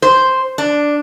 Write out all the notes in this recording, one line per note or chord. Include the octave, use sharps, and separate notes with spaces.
C5
D4